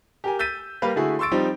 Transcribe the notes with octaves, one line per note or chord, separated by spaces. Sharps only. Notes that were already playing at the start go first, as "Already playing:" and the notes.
G4 A#4 G#5
E6 G6 A6 B6 D#7
G3 A#3 B4 F5
D3 A3 E4 F#4 G#4
C6 C#6 E6 A6 D7
F3 G3 C4 D#4